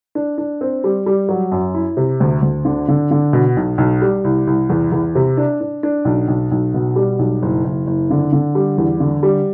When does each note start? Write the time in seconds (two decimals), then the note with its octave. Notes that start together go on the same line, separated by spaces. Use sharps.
0.15 D4
0.38 D4
0.61 C4
0.84 G3
1.06 G3
1.29 F#3
1.52 F#2
1.74 E4
1.97 C3
2.20 D2
2.42 D2
2.65 D3
2.88 D3
3.11 D3
3.33 B2
3.57 B1
3.78 B1
4.02 G3
4.24 C2
4.47 C2
4.70 E2
4.92 E2
5.15 C3
5.37 D4
5.61 D4
5.83 D4
6.05 B1
6.28 B1
6.51 B1
6.74 B2
6.96 G3
7.19 B1
7.42 F#1
7.64 F#1
7.87 F#1
8.10 D3
8.33 D3
8.55 G3
8.78 E2
9.00 D3
9.23 G3